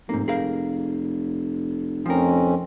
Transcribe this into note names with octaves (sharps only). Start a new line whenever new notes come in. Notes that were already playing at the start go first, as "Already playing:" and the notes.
F1 G#2 A#3
G#4 A#4 F5
F2 F3 C4 C#4 A#4